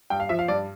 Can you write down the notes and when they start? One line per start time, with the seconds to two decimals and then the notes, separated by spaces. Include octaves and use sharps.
0.10 G2 G5
0.20 F5
0.29 F3 E5
0.39 F5
0.48 G2 D5